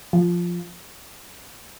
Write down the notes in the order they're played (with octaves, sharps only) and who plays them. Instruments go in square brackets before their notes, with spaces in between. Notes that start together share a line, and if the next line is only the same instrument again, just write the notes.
[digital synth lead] F3